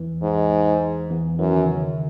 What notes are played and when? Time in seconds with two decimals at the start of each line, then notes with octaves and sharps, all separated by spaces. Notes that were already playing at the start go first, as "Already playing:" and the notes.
Already playing: E2 E3
0.22 G#2
1.10 E2 E3
1.39 F#2 E3
1.53 D#3
1.65 C#3
1.78 D#3